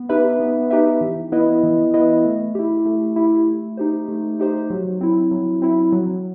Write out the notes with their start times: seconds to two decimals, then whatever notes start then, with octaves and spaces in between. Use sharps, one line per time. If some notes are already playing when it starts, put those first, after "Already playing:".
Already playing: B3
0.09 D#4 G4 B4 E5
0.40 B3
0.70 D#4 G4 B4 E5
1.01 E3
1.32 B3 E4 B4 D#5
1.63 E3
1.94 B3 E4 B4 D#5
2.24 A3
2.55 E4 G4
2.86 A3
3.16 E4 G4
3.47 A3
3.77 D#4 G4 C5
4.08 A3
4.39 D#4 G4 C5
4.70 F#3
5.01 C4 E4
5.31 F#3
5.62 C4 E4
5.92 F#3